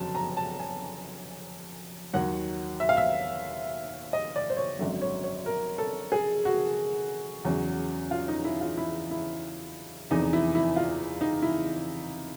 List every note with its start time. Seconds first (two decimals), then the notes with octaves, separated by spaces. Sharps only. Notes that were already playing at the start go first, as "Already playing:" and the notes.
Already playing: F#1 F2 D3 F#3 A5
0.15 A#5
0.37 A5
0.60 G#5
2.13 D#2 D#3 F#3 F#5
2.80 E5
2.89 F5
2.97 E5
4.13 D#5
4.36 D5
4.50 C5
4.57 C#5
4.79 G#1 F#2 D3 F#3 E5
5.01 C#5
5.24 C#5
5.46 A#4
5.78 A4
6.12 G#4
6.45 F#4
7.45 E2 C#3 F#3
8.11 F4
8.28 D#4
8.45 E4
8.61 F4
8.77 E4
9.11 E4
10.10 F1 E2 C3 E3 D#4
10.33 E4
10.55 E4
10.76 F4
11.21 D#4
11.42 E4